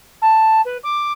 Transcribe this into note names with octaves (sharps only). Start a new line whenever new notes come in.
A5
B4
D6